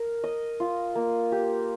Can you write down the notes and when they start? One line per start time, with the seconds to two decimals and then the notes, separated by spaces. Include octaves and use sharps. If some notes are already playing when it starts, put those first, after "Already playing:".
Already playing: A#4
0.24 D#5
0.60 F4
0.95 A#3
1.32 G4